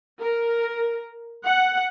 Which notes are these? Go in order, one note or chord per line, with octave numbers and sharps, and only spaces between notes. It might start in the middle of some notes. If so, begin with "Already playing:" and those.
A#4
F#5